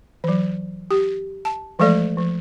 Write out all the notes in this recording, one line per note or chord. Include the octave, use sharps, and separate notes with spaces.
E3 F#3
G4
A5
E3 F3 G#3 A3 A4 D5
F3